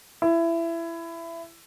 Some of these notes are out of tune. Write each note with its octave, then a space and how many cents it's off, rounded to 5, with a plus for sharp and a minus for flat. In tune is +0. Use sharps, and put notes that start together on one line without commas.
E4 +20